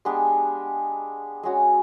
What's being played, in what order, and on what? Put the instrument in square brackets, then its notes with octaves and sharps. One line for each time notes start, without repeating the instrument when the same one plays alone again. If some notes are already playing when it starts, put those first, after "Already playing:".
[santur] G#3 B3 D4 G4
G#3 C#4 F#4